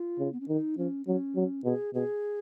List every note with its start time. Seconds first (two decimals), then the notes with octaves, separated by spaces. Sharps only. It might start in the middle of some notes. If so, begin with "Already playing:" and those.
Already playing: F4
0.19 C#3
0.33 B3
0.40 C#4
0.48 D#3 D#4
0.78 F3 C#4
1.06 F#3 C#4
1.35 F#3
1.64 B2 G#4
1.94 B2 G#4